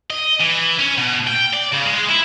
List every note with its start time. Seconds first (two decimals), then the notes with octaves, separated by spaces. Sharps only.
0.10 D#5
0.41 E3
0.79 C#4
0.98 B2
1.27 G5
1.53 D5
1.72 C#3
1.86 G#3
2.09 E4